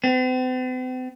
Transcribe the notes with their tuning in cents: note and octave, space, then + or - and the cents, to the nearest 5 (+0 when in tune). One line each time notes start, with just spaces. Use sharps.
C4 -45